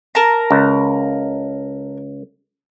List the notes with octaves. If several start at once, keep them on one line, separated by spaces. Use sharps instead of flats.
A#4 A5 A#5
C#2